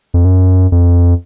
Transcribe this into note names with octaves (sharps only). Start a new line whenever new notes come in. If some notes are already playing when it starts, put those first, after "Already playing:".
F2
F#2
F2